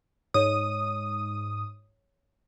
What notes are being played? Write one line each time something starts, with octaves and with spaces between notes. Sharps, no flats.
G#2 C#5 D#6